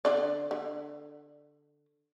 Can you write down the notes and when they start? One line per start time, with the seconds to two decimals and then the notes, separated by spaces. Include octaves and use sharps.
0.05 D3 D4 D5
0.51 D3